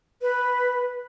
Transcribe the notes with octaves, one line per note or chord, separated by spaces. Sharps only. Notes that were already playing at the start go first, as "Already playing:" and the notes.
B4